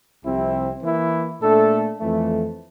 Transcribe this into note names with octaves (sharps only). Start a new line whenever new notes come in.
C2 C3 F3 C4 E4
E3 A#3 E4
A#2 A3 D4 A4
F2 E3 A3